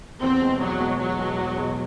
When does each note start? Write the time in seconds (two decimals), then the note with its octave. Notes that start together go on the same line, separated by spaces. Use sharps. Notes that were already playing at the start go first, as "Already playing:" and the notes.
0.22 E2 C4
0.42 B2 G#3
0.61 E2 F#3
0.80 B2 G#3
0.99 E2 F#3
1.19 B2 G#3
1.38 E2
1.57 B2 G#3